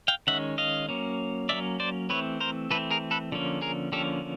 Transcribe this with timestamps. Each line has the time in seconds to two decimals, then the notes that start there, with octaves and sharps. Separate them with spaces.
0.08 F5 G5
0.27 D#3 G#3 C#4 E5 F#5
0.58 D#5 F5
0.89 F#3 A#3 C#4
1.49 F#3 A#3 C#4 D5 E5
1.80 C5 D5
2.10 E3 A3 C4 B4 C#5
2.40 A#4 C5
2.70 E3 A3 C4 A4 B4
2.91 G#4 A#4
3.11 A4 B4
3.32 D3 F3 A#3 C#4
3.62 G#4 A#4
3.92 D3 F3 A#3 C#4 G4 A4